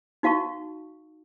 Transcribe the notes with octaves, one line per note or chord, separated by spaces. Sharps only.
D#4 F#4 F5 A5 C#6